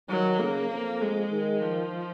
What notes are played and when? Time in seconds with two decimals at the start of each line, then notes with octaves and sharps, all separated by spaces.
0.09 D#3 F#3
0.40 C#3 A#3
0.70 F2
1.01 G#3
1.31 D#3
1.61 F3